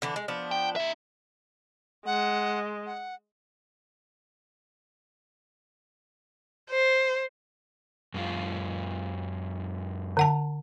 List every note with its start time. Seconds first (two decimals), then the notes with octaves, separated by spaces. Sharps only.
0.02 D3 E3 D4
0.16 G#3
0.28 F3 B3 D4
0.51 G5
0.76 D#4 E5
2.06 G#3 F#5
2.86 F#5
6.70 C5
8.14 F#2 G#3 F4
10.17 D3 F#5 A5